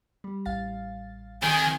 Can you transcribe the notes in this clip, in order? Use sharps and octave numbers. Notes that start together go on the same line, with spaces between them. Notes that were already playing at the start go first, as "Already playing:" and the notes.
G3
A1 F5 A6
D#3 C4 G#5